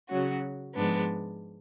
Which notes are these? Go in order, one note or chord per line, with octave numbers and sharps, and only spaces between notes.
C#3 F#3 C#4 F#4
G#2 F3 G#3 B3 D4